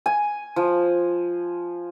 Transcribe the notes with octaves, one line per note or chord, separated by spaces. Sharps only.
G#5
F3